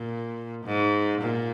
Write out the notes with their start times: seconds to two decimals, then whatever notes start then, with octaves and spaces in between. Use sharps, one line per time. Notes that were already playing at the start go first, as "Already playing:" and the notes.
Already playing: A#2
0.65 G#2
1.21 A#2